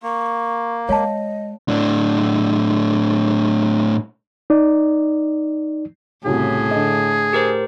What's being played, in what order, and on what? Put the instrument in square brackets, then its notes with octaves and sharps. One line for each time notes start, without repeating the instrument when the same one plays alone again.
[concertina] A#3 [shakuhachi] C#6
[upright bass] G#3 [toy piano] C#5 F5 A5 [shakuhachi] D#5
[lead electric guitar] A2 D4
[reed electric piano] D#4 D5
[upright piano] C2 C#3 F#4 [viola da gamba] A2 [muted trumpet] G#4
[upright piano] D3 D#5
[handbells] G4 A#4 C5